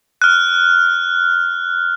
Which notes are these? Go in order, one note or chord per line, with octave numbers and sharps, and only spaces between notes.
F6 F#6